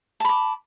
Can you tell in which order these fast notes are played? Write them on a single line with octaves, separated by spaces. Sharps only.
A5 B5 D6